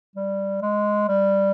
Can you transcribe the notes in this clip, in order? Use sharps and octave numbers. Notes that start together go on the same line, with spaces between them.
G3
G#3
G3